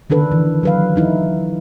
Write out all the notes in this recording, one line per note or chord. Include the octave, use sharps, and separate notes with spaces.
D3 D#3 D4 A4 B4
E3
F#3 B4 F5
E3 D#4 E4